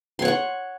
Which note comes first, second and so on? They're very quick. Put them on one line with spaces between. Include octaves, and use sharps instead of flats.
C6 C#5 F#5 C#6